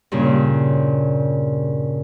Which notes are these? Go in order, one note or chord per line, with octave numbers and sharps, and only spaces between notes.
G2 A#2 C#3